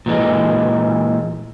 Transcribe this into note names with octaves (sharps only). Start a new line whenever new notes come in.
A#2 E3 G#3